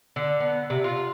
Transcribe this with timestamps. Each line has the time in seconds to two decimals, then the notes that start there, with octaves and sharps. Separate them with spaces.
0.16 D3
0.40 B3
0.70 C3
0.84 F4